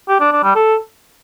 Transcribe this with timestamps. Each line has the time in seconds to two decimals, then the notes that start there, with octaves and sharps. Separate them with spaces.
0.09 G4
0.20 D4
0.32 D4
0.44 G3
0.55 A4